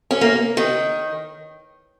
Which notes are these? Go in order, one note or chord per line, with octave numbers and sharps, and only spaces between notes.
C#4
A#3
D#3